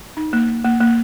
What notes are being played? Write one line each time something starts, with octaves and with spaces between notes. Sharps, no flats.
D#4
A#3
A#3
A#3
A#3